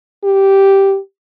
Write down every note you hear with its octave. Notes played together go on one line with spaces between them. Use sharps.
G4